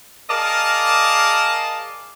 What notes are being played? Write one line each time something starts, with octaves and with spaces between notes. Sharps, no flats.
G#4 A#4 D5 D#5 F5 A5